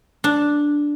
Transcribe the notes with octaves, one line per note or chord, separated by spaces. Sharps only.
D4